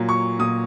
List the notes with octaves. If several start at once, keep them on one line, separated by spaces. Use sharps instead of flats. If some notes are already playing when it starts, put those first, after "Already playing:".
Already playing: A#2 F#3
C#6
A#2 D#6